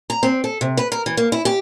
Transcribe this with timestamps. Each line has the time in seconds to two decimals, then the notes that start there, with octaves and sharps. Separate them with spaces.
0.10 A#5
0.23 C4
0.44 A4
0.61 C3
0.77 B4
0.92 A#4
1.06 E3
1.17 A#3
1.32 E4
1.45 G4